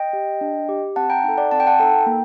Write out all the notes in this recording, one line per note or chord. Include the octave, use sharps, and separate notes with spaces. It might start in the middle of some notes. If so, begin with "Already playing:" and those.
Already playing: D#5 G5
G4
D4
G4
C4 F#5 A5
G5 A#5
D#4 F#5 A5
A4
D5 F#5
C4 A5
G5
F#5 A5
D#4 A4 G5 A#5
A#3